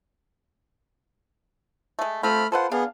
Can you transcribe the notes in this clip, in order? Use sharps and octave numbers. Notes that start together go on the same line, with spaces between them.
G#3 A3
F3 A3 C4 B5 F6
F4 A4 B4 C5 F#5
B3 D4 G#4 F5